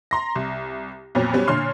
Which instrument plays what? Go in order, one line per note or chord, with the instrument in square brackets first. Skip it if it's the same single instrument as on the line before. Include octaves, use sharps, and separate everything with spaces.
[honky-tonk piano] A#5 C6 A#6
C2
F2 A#2 F#3 B3
F#3 G3 B3 C#4
A#2 D3 C#5 C6 F6 C7